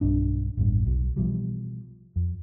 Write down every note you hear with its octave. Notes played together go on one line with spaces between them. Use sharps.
B1 G2 D4
A1 E2 G2
B1
B2 E3 F3 G3
F2